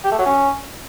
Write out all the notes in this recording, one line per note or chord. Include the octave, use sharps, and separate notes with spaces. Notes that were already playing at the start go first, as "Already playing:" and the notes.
G4
A3
F#3
C#4